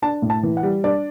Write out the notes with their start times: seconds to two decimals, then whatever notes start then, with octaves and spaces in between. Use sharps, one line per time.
0.02 D4 A5
0.22 A2
0.30 A5
0.43 E3
0.57 F#5
0.63 G3
0.84 D4 D5